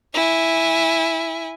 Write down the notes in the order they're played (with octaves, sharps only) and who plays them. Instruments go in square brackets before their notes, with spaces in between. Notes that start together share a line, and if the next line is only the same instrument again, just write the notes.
[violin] E4 G#5